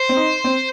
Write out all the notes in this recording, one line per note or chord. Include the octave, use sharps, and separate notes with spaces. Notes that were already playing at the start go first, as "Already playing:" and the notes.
Already playing: C5
C4
D#4
C4